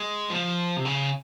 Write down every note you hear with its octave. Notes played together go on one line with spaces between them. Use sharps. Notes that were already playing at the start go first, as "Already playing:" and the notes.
Already playing: G#3
F3
C3
C#3